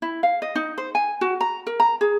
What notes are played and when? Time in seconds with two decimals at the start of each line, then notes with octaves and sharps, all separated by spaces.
0.02 E4
0.23 F5
0.42 D#5
0.55 D#4
0.78 C5
0.95 G#5
1.21 F#4
1.41 A#5
1.67 A#4
1.80 A#5
2.01 G#4